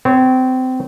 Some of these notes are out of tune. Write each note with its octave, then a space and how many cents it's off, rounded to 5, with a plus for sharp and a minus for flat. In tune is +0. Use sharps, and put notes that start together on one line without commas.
C4 -25 C#5 -5